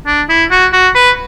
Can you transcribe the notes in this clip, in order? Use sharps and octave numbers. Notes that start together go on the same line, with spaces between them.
D4
E4
F#4
F#4
B4